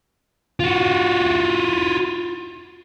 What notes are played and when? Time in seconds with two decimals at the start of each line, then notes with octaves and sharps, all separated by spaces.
0.60 F4 F#4